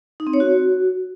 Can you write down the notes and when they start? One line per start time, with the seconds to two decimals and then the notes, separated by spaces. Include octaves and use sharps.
0.20 D#4
0.27 C4
0.33 C#5
0.40 F#4